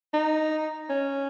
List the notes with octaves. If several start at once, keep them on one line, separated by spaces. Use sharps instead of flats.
D#4
C#4